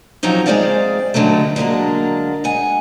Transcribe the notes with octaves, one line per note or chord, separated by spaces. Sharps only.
F3 F#3 C4 C#4 D#4 C#5
G#3 C4 G#4 C5 D5 F5
G2 D3 D#3 F#3 A3
D3 F#3 G#3 A#3 D4
G#3 F#5 G#5